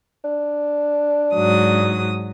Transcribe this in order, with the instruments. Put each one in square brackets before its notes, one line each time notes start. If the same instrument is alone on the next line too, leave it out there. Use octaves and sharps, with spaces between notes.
[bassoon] D4
[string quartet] G#2 F#3 D#6